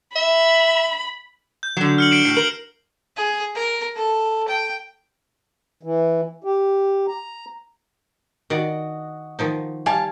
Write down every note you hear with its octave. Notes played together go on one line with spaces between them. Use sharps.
E5 B5
G6
D3 F#3
F6 C#7 F#7
C7 D7 E7
A2 C7
A#4 F#7
G#4
A#4
A4
G5
E3
G4
A#5
D#3 F#4 D5 D#5
D#3 F3 D#4
G3 F5 G#5 A5